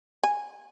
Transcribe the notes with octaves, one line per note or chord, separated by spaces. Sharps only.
G#5